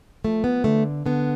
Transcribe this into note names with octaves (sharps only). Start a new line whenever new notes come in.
F3 A3
B3
D3 A3
D3 B3